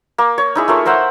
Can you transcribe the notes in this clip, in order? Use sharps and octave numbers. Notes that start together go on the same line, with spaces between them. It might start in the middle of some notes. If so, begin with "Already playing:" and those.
A#3
C#5
D#4 E4 G#4
A3 F4 A#4 C#5
A#4 C5 E5 F#5